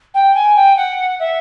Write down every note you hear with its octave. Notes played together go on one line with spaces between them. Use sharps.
G5
G#5
G5
F#5
E5